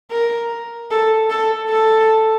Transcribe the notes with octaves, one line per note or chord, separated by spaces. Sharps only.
A#4
A4
A4
A4